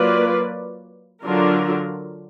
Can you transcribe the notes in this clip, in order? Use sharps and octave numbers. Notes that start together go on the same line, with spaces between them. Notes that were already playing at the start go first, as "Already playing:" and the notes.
Already playing: F#3 A#3 F4 B4 D5
D3 F#3 D4 F4 A#4